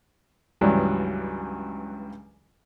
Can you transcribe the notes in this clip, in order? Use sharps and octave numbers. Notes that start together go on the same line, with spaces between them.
C#2 G2 E3 F#3 D5